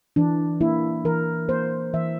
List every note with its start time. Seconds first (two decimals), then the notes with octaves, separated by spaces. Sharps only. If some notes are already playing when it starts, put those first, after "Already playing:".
0.16 E3 D4
0.61 A#3 E4
1.05 E3 A#4
1.49 A#3 C5
1.93 E3 E5